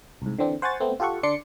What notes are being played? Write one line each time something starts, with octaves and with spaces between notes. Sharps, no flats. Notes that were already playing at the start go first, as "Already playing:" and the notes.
C2 G#2
D3 E3 C4 D4
C5 F#5 G#5 C#6 A6
A3 B3 C4
F4 G4 A4 F#5 C#6
D3 D4 D5 C6 D6 C#7